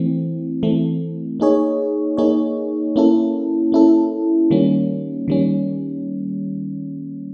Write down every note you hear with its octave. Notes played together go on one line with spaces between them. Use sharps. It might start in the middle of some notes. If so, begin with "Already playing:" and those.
Already playing: E3 A3 C4
E3 A3 C4
A#3 D#4 G#4 C#5
A#3 D#4 G#4 C#5
A#3 C#4 E4 A4
A#3 C#4 E4 A4
D#3 G3 A#3 C#4
D#3 G3 A#3 C#4